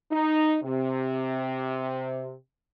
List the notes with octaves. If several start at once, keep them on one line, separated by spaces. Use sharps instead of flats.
D#4
C3